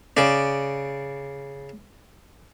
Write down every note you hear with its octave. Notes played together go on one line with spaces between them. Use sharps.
C#3 D5